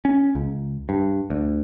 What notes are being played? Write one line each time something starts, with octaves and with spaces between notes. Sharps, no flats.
C#4
C#2
G2
D2